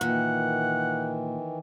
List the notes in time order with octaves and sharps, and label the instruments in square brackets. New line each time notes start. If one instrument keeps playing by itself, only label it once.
[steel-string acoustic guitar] A#2 [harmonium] D#3 E3 [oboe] F#5